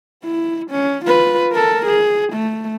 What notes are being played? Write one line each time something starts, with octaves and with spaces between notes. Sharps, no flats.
E4
C#4
F4 B4
A4 A#4
G#4
A3